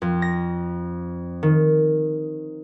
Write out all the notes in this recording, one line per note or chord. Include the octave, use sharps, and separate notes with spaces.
F2
A#6
D#3